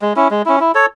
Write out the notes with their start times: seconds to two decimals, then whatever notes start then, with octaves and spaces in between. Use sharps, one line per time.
0.02 G#3
0.16 C#4 E4
0.31 G#3
0.46 C#4 E4
0.60 E4
0.75 A4 C#5